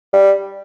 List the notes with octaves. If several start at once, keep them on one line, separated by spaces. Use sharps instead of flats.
G3